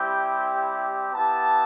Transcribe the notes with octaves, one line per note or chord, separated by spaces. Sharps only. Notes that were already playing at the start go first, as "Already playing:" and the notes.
Already playing: G3 C4 E4 G4 G5
B3 E4 G4 A5